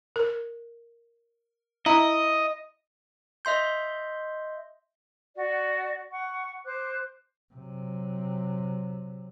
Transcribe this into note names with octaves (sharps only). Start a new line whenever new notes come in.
A#4
E4 D#5 A#5
D#5 E5 C6 G6
F#4 D5
F#5 C#6
C5 D6 F#6
C3 F#3